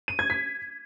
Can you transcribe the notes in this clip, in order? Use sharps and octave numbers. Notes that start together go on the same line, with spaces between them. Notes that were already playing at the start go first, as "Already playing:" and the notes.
D#7
G#6
B6